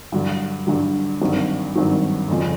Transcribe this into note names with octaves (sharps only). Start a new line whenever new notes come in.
G2 D3 F#3
G2 D3 F#3
G#1 G2 D#3 F#3
G#1 G2 D#3 F#3
F1 F2 C#3